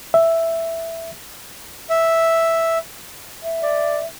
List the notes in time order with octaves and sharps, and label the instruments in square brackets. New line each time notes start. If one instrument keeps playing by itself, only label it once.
[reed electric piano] E5
[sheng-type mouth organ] E5
[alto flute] E5
[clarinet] D5